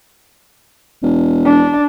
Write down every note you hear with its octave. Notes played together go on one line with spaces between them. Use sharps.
E1
D4